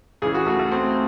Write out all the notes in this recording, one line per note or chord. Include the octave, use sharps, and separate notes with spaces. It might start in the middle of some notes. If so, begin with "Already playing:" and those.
C#2 C#3 E3 G#4
F#4
A3
A3
C4